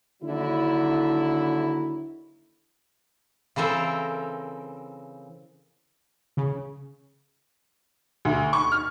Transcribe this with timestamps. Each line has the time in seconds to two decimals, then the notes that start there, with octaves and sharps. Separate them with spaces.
0.23 D#2 D3 F#3 E4
3.56 C#3 E3 C4 A4 A#4
6.37 C#3
8.25 D2
8.53 C#6
8.72 F6